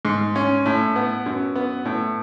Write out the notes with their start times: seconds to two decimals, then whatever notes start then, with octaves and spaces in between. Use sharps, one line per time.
0.05 G#2
0.36 C#4
0.65 A2
0.96 B3
1.26 F#2
1.55 B3
1.85 A2